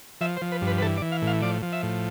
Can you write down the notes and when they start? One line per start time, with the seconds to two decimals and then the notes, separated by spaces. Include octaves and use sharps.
0.21 F3 E5
0.36 C5
0.42 F3
0.52 B4
0.62 G2
0.67 B4
0.78 B4
0.82 E3 A4
0.97 D5
1.02 E3
1.12 F5
1.22 A2
1.27 F5
1.42 F3 D5
1.62 F3
1.73 E5
1.83 A2